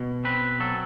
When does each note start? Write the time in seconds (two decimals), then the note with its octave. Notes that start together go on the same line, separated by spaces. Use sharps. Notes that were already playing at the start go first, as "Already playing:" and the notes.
Already playing: B2
0.25 C4 B4
0.60 F#3 A4